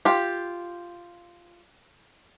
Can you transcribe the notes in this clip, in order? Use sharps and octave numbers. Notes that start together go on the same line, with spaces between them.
F4 G4